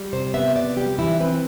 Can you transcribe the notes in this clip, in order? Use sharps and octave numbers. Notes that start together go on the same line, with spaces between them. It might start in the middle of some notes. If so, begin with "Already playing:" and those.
Already playing: G3
C3 C5
B3 E5
C3 D5
G3 G4
E3 E4
C4 B4